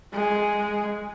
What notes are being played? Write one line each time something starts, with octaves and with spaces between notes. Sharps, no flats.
G#3